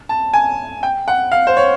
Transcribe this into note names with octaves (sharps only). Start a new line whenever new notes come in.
A5
G#5
G5
F#5
F5
C5
C#5